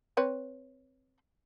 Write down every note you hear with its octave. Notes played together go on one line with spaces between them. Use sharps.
C4 B4 C#5